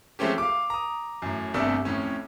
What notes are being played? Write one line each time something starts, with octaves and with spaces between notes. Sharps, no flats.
F3 G#3 A3 C4 C#4 G4
F5 D6
A#5 D#6
F#2 A2
G1 C2 C3 A3 D4 E6
F2 A2 C#4